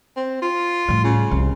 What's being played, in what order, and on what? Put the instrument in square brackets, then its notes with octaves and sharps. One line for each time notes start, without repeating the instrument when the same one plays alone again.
[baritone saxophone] C4
F4
[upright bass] A2 G3
[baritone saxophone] C#3
[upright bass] C2